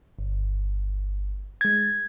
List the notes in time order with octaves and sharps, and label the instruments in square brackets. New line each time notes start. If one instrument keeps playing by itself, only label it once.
[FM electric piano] G1
[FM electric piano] G#3 A6 [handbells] G#6